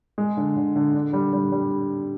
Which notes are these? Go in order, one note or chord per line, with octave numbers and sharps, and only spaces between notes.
G#3
D3
D3
D3
D4
G3
G3
G3